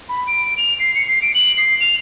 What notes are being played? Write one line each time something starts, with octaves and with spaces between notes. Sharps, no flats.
B5
D7
F7
C7
C#7
C7
D7
F#7
C7
F7